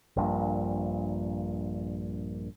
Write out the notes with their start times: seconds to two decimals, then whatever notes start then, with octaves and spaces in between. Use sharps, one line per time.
0.16 A#1 G2 A#2